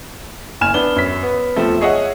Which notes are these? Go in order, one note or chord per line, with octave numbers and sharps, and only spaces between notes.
F#1 G#5 F6 E7
B3 D4 G7
F#2 B6
B3
E1 F3 A3 C4
G#4 C#5 D#5 E5 F#5